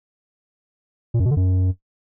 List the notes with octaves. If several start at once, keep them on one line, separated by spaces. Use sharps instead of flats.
A#2
F#2
B2
D3
F#2